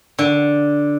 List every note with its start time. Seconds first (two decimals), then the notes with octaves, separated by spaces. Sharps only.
0.19 D3